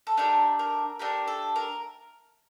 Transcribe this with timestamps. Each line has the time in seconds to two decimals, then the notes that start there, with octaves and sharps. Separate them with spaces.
0.07 A4
0.17 A3 D4 G4 A#4
0.59 A#4
0.99 A3 D4 G4 A#4
1.28 A4
1.56 A#4